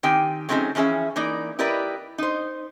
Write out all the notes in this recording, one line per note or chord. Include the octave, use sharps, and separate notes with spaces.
D#3 C4 G4 G5 G#5
F#3 A3 C4 C#4 D#4 G#4
E3 F3 C#4 G#4 E5
E3 A#3 D#4 D5
E4 G4 A#4 B4 D5 D#5
D#4 C5